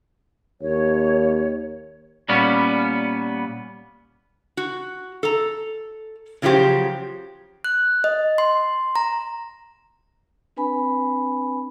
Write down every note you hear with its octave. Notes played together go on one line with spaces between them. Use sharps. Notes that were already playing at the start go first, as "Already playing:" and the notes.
D#2 C#5
A#2 G3 B3 C#4
F#4
A4 A#5
C#3 F3 F#3 F4 G4 C5
F#6
D#5
C6
A#5
C4 D4 B4 G#5 B5